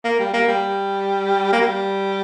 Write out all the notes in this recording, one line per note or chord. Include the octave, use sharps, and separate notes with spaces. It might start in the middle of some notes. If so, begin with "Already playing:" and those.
A#3
G3
A#3
G3
A#3
G3